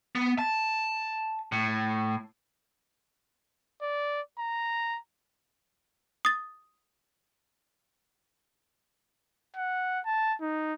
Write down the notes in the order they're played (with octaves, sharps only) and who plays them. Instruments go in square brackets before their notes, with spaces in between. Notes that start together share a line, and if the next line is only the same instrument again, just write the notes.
[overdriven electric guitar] B3
A5
A2
[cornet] D5
A#5
[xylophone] D#6 A6
[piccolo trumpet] F#5
A5
D#4